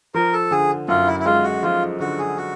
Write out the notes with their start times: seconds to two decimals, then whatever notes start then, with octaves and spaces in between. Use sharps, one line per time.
0.14 F3 A#4
0.33 A4
0.51 D3 G#4
0.88 F#2 F4
1.07 E4
1.19 E4
1.25 G#3 F4
1.44 F#4
1.63 F3 F4
2.00 D3 F#4
2.18 G#4
2.37 F#4